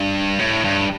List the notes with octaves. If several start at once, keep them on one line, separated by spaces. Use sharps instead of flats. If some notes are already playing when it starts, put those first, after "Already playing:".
Already playing: G2
A2
G2